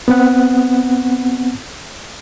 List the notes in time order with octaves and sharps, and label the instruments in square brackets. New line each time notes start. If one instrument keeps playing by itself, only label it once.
[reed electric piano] B3 C4 F#5